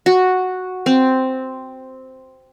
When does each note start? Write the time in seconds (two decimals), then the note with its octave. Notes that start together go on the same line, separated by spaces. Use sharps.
0.06 F#4
0.86 C4